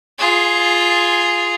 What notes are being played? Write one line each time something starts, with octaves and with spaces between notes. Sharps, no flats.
F4 G#4